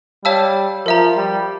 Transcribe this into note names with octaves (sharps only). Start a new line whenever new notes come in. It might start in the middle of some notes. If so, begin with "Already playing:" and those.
G3 C#5 F5 A5 E6
F3 A#4 E5 A#5
G3